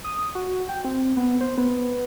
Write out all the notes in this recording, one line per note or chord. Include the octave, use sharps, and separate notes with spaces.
D#6
F#4
G5
C4
B3
C5
B3